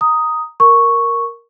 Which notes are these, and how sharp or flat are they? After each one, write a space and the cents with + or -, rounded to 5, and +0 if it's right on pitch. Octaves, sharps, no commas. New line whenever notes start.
A#5 +0 D#6 +5
A#4 +0 C#6 +0